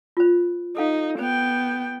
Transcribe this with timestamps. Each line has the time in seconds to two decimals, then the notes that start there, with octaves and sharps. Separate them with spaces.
0.17 F4 C5
0.77 D#4 A4 F5
1.19 B3 C5 G5